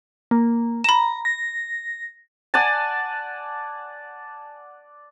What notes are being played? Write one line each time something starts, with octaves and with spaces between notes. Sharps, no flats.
A#3
A#5 B5 E7
A#6
D5 F#5 G#5 A5